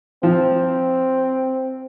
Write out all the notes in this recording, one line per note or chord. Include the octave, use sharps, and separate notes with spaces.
F3 C4